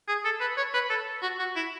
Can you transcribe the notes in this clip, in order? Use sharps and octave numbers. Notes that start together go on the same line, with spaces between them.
G#4
A4
B4
C#5
B4
A4
F#4
F#4
E4